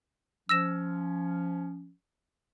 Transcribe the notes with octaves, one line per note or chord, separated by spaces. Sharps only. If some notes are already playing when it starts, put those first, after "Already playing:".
F3 C#4 E6 A#6 E7